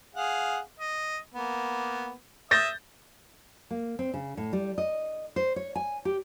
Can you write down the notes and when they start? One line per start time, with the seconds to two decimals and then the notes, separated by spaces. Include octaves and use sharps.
0.15 G#4 F5 F#5
0.80 D#5
1.34 A#3 B3
2.51 E5 D#6 G6 A6 A#6
3.71 A#3
3.99 C4
4.14 C#3
4.37 A2
4.53 G3
4.78 D#5
5.36 C5
5.56 C#5
5.75 G#5
6.05 G4